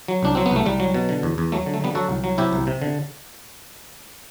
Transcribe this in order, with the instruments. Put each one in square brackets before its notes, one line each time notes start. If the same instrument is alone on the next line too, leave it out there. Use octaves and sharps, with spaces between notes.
[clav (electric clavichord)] F#3
C2 D4
F#3 C4
B3
C2 A3
C2 G3
F#3
B2
D3
E2
E2
F#3 A3
D3
A3
D3 G3 B3
F#3 F#4 A4
C2
F#3
C3 E4 G4
C2
C3
D3